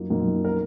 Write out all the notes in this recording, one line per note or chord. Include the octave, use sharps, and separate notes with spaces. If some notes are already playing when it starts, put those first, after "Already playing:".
Already playing: F#2 F3 A#3 D#4
F#2 F3 A#3 D#4
A#4